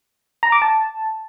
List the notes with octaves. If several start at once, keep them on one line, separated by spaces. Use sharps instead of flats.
A#5
D6
A5